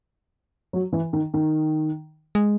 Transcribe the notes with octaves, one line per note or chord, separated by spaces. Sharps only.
F#3
E3
D#3
D#3
G#3